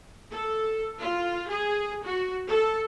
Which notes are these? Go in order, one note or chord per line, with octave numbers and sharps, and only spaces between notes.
A4
F4
G#4
F#4
A4